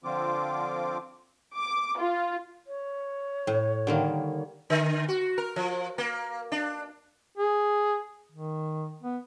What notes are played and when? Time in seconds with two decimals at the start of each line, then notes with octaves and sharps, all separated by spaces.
0.04 D3 F3 C4 F4 D6
1.57 D6
1.99 F4
2.67 C#5
3.47 A2
3.87 D3 D#3 G3 A#3
4.70 D3
5.08 F#4
5.38 A#4
5.56 F3
5.98 A#3
6.52 D4
7.37 G#4
8.32 D#3
9.03 B3